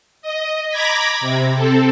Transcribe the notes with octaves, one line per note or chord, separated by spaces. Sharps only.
D#5
A#5 B5 D6 G#6 A#6 B6
C3
C4 A4